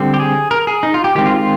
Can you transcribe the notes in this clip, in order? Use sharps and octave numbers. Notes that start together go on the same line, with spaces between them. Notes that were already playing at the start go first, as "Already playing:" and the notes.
Already playing: D3 G3 C4
G4
G#4
A#4
G#4
D#4
F4
G4
D#3 G#3 C4 G4
F4
F4